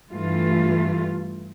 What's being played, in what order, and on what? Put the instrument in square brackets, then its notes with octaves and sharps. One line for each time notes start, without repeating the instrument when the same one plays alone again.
[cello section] G2 E3 A3 F4